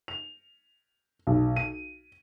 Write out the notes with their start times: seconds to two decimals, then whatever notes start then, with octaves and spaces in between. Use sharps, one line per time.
0.08 F7
1.27 B1
1.56 D#7